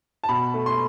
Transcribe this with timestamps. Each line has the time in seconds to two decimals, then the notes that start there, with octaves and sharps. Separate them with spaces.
0.24 A5
0.29 B2 B5
0.54 A3
0.66 C6